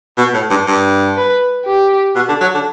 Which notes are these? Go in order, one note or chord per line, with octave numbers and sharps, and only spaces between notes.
B2
A2
G2
G2
B4
G4
B2
D3
F#3
D3